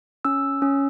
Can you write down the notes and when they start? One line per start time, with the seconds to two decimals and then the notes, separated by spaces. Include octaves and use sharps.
0.25 C#4 E6
0.62 C#4